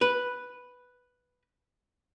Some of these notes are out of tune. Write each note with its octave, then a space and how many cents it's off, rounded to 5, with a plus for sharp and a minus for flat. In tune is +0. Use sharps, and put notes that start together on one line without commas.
B4 +0